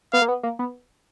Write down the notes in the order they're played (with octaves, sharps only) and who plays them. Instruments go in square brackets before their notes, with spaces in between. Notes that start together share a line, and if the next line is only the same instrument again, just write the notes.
[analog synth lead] B3 [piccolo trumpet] F5
[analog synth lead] A#3
B3
A#3
B3